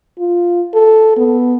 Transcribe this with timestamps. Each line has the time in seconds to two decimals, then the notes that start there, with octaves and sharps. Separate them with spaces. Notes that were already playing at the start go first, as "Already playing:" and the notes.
0.19 F4
0.74 A4
1.17 B3